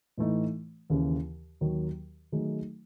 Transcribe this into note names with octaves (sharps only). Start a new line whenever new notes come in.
A2 E3 A3 D#4
D#2 C#3 E3
D#2 D#3 F#3
D#3 F#3 A3 D#4 G#4